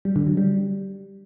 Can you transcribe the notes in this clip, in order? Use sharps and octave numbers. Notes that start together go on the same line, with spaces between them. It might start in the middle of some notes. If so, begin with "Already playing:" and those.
G3
D3
F#3
G3